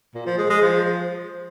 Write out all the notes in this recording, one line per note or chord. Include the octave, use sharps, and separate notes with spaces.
A#2
F3
G#3
G#3
F3